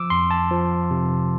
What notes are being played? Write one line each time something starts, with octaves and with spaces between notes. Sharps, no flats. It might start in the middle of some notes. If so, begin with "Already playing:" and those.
Already playing: F3 D6 E6
F2 C6
A5
F3
C3